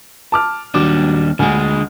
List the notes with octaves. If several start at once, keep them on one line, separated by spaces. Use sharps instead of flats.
A5 D6 F6
D#2 F#3 G3 D4 D6
D2 D3 G#3 G#5 F6